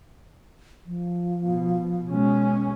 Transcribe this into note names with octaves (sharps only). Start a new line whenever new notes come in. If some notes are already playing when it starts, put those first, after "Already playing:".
F3
B2
B2 G#3 C#4